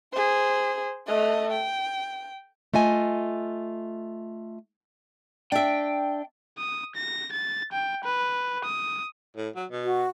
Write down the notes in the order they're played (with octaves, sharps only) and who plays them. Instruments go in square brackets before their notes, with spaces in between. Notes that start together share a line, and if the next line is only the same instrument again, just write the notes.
[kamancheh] G#4 C5
A3 D#5
G5
[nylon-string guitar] A3 F4 D#5 G#5
[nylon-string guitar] D4 E5 [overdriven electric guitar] G5
[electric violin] D#6
A#6
A6
G5
B4
D#6
[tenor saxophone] A2
F#3
B2
[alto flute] F#4